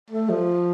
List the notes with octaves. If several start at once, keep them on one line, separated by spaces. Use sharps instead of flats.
A3
F3